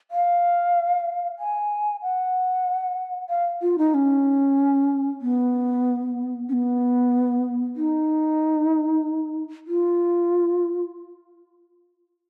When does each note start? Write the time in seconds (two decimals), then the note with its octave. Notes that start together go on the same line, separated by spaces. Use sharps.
0.11 F5
1.39 G#5
2.02 F#5
3.29 F5
3.62 F4
3.78 D#4
3.94 C#4
5.21 B3
6.49 C#4
6.53 B3
7.76 D#4
9.67 F4